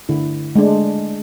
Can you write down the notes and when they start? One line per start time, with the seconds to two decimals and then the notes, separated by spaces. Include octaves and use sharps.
0.09 D3 E4
0.56 G#3 A3 D4